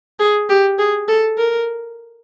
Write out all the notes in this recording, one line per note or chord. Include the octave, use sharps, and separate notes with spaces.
G#4
G4
G#4
A4
A#4